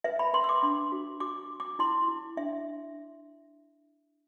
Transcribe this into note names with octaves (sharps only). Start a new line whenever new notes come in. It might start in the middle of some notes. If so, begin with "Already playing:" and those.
B4 E5
B5
B4 C6
E6
D6
D4 C6
F#4
F#4 D6
F#4
D6
E4 C6
E4
D4 E5